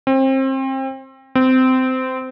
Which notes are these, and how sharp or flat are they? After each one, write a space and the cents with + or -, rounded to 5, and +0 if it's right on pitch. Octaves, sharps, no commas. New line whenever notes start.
C4 +30
C4 -20